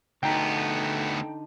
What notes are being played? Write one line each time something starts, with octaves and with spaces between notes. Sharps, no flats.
D2 D3 B3 D#4 A4 G5 A#5